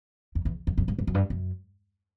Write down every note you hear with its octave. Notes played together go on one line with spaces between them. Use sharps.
F2
E2
F2
F#2
G2
G2
F#2
G2
F#2